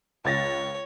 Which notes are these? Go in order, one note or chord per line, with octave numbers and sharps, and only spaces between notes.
C#2 C#5 A6 A#6